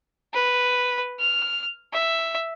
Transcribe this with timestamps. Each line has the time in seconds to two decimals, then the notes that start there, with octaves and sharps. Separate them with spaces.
0.34 B4
1.20 F6
1.93 E5